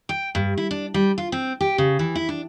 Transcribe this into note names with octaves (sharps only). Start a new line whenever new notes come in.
G5
G2
E4
D4
G3
F4
C4
G4
C#3
E3
E4
D4